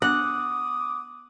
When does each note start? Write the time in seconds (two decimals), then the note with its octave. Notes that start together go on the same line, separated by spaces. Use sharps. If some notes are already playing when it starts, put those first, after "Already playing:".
0.02 B3 D4 F#5 D6 D#6